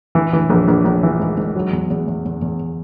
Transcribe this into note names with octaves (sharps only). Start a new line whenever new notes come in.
E3
E3
A#1
A#1
A#1
E3
G#2
G#2
F#3
E2
E2
E2
E2
E2